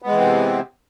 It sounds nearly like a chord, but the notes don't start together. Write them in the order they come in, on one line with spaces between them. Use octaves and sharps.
B3 G#3 E3 C4 C3